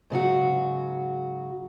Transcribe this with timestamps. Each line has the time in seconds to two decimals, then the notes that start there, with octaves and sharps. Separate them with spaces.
0.10 G#2 C#3 F#3 F#4